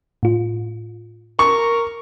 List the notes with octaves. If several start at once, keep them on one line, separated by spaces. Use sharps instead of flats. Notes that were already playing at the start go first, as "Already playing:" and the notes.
A2 F4
A#4 C#6